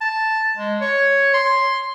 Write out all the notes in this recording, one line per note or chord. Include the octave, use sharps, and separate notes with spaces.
A5
G#3
C#5
C6